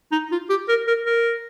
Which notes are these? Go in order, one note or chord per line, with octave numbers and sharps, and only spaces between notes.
D#4
F4
G4
A#4
A#4
A#4